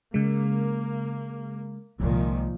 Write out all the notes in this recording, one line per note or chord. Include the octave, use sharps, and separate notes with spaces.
C#3 G#3 A#3
C2 A#2 D#3 F3 G#3